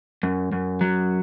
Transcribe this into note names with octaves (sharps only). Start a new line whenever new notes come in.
F#2
F#2
F#3